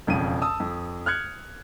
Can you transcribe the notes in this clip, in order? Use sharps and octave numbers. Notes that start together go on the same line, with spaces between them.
E1 F2 C#3 D#7
A5 D#6 E6
F2
F6 F#6 G#6 C#7